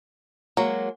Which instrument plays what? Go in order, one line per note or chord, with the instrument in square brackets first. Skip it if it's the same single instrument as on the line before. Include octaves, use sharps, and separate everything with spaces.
[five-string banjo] F#3 [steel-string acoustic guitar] G#3 A#3 F#4